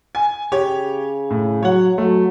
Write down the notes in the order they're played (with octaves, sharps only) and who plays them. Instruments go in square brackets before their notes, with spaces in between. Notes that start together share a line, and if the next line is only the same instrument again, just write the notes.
[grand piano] G#5
[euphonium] C#3 [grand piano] G4 C#5
[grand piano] A2
[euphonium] F#3 [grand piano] C#5 F#5
[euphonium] F#3 [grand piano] A3